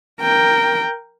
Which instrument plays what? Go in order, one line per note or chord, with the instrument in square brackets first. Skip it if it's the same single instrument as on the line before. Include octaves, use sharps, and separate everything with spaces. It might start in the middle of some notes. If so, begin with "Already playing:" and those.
[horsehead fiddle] A#4 G5